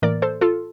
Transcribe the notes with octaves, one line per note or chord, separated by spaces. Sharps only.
A2 E3 A#3 A#4 D5
A4 C5
F4 A4